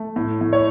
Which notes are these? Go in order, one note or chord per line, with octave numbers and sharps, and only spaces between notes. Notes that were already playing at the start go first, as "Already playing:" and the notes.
Already playing: A3
A2
A2
C#5